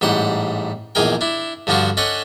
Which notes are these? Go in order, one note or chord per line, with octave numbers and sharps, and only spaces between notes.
A1 G#2 G3 C5 F#5
A#1 E2 D#4 G#4 A#4 G5
D4 E4
G2 D3 F3 D4 F4 F#4
C#4 D4 A4 D#5 F#5